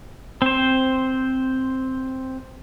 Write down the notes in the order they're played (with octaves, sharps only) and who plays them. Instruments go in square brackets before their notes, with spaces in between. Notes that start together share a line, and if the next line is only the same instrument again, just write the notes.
[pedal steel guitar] C4 C5